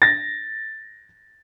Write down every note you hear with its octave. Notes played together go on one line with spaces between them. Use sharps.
A6 A#6